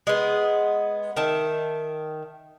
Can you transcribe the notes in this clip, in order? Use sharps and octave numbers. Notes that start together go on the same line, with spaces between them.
G#3 B3
D#3 E5 A5